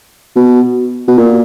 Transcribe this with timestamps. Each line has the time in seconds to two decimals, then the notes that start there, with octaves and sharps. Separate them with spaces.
0.36 B2
1.08 B2
1.18 A#2